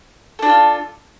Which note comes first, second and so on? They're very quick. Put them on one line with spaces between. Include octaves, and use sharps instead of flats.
A4 D4 F#4 F4